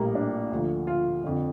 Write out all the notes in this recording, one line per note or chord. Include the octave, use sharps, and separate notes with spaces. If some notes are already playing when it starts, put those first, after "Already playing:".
Already playing: A#1 A2 G3 A#3
D4
D2 D3 F3
F4
F2 D3